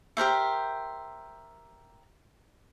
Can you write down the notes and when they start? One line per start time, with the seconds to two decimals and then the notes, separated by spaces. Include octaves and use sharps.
0.17 G4 A#4 C5 E5